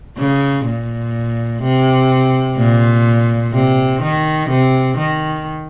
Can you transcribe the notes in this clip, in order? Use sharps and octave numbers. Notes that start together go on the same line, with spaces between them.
C#3
A#2
C3
A#2
C3
D#3
C3
D#3